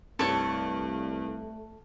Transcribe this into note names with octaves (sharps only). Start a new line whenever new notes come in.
C2 G2 A3 A4 C#5 C#6